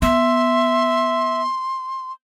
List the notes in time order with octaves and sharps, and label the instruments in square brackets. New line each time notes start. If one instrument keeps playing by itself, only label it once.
[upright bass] B3 [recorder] E5 [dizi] C6